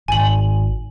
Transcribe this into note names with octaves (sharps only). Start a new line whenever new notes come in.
G#1 G#5 F#7